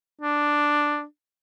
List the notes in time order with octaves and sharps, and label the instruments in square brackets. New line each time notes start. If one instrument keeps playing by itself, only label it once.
[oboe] D4